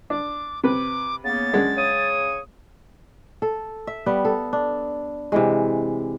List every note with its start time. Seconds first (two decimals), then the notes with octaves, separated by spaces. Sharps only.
0.10 D4 D6
0.64 C3 B4 D6
1.24 C#3 A#3 B3 A6
1.53 F#2 G#3 D4
1.77 C#3 C#5 D#6
3.42 A4
3.87 E5
4.06 G3 B3
4.25 A4
4.53 D4
5.32 C3 E3 G#3